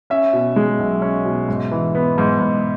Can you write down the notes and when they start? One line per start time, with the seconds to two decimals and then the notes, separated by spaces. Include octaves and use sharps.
0.10 C#4 E5
0.33 B2
0.56 G#3
0.79 B1
1.02 C#4
1.25 B2
1.48 G#2
1.71 E3
1.95 B3
2.18 G#2
2.40 G#2